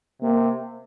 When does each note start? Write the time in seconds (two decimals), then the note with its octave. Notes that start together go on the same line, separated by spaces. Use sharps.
0.22 C3 A#3